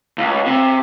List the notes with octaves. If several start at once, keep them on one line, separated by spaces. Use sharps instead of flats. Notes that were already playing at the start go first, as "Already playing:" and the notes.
C#2
C3